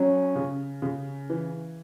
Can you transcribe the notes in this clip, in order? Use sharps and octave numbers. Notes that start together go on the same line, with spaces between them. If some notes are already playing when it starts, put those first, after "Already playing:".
Already playing: F#3 C#4
C#3
C#3
E3